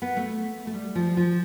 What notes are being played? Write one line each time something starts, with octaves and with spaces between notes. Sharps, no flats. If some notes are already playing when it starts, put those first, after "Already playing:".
B3
A3
A3
G3
F3
F3